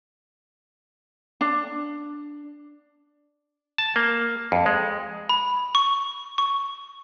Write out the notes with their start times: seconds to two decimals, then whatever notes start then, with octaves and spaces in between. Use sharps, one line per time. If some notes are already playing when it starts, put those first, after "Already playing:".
1.41 D4
3.78 A5
3.96 A#3
4.52 F2
4.66 G#3
5.29 B5
5.75 C#6
6.38 C#6